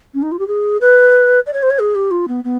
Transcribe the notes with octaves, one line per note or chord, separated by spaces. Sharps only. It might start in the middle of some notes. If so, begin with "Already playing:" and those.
C#4
D#4
F4
G4
G#4
B4
D5
C#5
C5
C#5
G#4
G4
F4
B3
B3